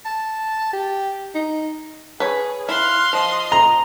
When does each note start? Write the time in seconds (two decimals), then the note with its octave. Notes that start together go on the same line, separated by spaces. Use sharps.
0.05 A5
0.73 G4
1.35 D#4
2.20 G#4 B4 C#5
2.69 E4 F5 C6 F6 F#6
3.13 F3 D#5
3.52 A#5